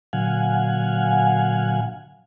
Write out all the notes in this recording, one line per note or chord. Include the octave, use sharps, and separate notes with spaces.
A#2 D3 F#3 F5 F#5 G#5